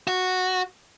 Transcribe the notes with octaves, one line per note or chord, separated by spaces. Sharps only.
F#4